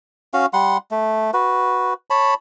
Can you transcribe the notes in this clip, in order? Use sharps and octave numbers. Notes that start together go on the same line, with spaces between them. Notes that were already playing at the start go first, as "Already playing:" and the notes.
C#4 F#4 F5
G3 F#5 C6
A3
F#4 B4
C#5 A5 B5